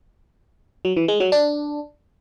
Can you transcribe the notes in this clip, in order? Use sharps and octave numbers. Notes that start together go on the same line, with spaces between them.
F#3
E3
G#3
F#3
D4